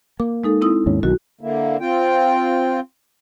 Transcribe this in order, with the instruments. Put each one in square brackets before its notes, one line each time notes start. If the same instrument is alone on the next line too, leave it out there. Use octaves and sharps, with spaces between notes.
[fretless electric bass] A#3 [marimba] D6
[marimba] G#3 D#4 A4
C4 E4 D#6
[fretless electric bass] D#2 G#2 C#4
[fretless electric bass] B1 D#3 [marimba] F#4
[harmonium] D3 A#3 E4
C4 F4 G5